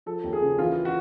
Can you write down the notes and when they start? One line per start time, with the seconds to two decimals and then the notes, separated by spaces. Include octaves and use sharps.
0.06 F3 A4
0.24 D#2
0.33 G#4
0.41 C#3
0.58 E3 F4
0.85 F#4